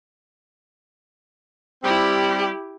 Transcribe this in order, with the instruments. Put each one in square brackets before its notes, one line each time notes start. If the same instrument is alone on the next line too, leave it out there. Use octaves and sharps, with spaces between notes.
[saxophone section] G3 C4 [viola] E4 G4